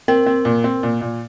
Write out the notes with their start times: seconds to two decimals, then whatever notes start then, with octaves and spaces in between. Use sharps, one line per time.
0.08 C4 A#4
0.26 C4
0.45 A#2
0.64 C4
0.83 A#2
1.01 A#2